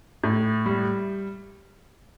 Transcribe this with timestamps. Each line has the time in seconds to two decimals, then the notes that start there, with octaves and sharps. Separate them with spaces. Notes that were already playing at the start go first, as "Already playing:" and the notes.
0.23 A2
0.66 G3